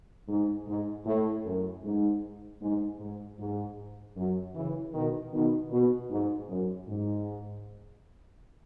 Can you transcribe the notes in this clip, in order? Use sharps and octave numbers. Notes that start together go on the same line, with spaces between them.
G#2
G#2
A2
F#2
G#2
G#2
G#2
G#2
F#2
C#3 E3
B2 D#3
B2 D#3
B2
G#2
F#2
G#2